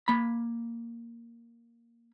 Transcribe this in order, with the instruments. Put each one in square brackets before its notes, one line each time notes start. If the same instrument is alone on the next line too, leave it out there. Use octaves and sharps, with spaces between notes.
[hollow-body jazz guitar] A#3 B5